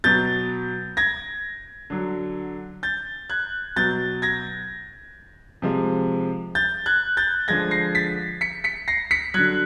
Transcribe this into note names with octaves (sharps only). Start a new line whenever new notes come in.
B2 F#3 G6 A6
G#6 A#6
D3 F#3
G6 A6
F#6 G#6
B2 F#3 G6 A6
G#6 A#6
C3 F3 G#3
G6 A6
F#6 G#6
G6 A6
D3 F3 G#3 G#6 A#6
A#6 C7
A6 B6
B6 C#7
B6 C#7
A#6 C7
B6 C#7
D3 F#3 F#6 G#6